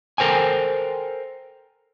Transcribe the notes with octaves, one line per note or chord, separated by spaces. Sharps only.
A4 A#4 C5 G5 G#5